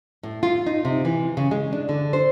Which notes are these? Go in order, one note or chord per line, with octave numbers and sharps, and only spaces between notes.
A2
F4
D#4
C3
E3
C#3
G#3
D4
D3
C5